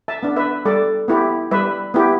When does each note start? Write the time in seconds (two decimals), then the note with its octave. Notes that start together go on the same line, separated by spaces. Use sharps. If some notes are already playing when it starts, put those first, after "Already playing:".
0.08 E5 A5
0.23 B3 D4
0.36 B4 E5
0.65 G3 A4 D5
1.08 B3 E4 G4
1.51 G3 B4 E5
1.94 B3 E4 G4